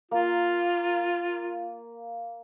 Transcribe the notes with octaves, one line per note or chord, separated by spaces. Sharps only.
A#3 F4